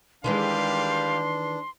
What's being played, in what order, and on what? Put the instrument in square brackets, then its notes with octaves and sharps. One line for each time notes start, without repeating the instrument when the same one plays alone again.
[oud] D#3 E3 G#3 [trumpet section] G3 G4 F5 [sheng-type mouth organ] D4 [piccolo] C6